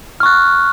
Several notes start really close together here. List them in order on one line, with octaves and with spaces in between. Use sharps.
F6 C#6 F#6